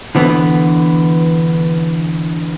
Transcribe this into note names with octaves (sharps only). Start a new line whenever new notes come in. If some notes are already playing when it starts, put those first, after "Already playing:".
D3 E3 B3